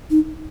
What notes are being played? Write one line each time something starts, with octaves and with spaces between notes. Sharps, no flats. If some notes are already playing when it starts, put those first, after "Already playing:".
D#4